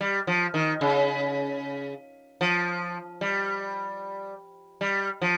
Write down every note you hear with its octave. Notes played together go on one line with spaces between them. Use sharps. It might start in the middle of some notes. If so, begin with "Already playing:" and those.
G3
F3
D#3
C#3
F3
G3
G3
F3